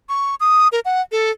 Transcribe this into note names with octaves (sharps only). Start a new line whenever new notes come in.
C#6
D#6
A#4
F#5
A4